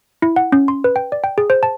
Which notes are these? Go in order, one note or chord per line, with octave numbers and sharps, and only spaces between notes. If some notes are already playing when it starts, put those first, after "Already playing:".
E4
F#5
C#4
C6
B4
G5
D5
G5
G#4
C5
A5